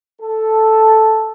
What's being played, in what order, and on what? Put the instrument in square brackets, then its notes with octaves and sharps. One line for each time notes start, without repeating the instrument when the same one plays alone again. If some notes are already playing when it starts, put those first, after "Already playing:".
[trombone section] A4